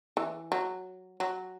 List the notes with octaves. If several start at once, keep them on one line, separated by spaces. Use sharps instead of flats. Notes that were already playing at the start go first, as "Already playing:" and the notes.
E3
F#3
F#3